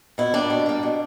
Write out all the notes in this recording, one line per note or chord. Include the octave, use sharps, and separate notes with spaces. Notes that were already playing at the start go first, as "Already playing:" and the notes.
B2 E4
G3 A#3 D4
B2
G3 A#3
B2